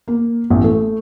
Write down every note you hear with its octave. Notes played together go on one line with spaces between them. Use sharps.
A#3
A1
A3